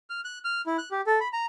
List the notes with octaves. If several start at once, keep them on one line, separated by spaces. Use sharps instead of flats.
F6
F#6
F6
E4
F#6
G4
A4
B5
A#5